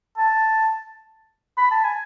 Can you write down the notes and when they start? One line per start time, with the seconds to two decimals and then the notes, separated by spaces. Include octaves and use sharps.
0.18 A5
1.57 B5
1.71 A5
1.84 G#5